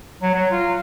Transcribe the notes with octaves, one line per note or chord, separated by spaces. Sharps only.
F#3
F#3
F4